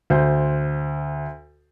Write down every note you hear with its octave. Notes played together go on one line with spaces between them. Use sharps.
D2 C5 G6